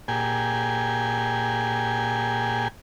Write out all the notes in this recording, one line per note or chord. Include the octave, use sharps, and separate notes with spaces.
A#2 G4 G#4 G#5